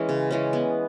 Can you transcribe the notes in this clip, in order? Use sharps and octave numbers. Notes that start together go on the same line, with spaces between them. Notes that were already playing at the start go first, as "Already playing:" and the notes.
Already playing: E3 G#3 C#4
C#3
E3 G#3 C#4
B3